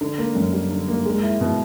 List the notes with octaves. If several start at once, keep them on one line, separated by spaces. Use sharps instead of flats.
D3
A#3
F#2
G3
D3
A#3
G#3
E4
B2